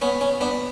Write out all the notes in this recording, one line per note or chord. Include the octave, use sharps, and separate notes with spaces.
B3 C#4
C#4
B3 D4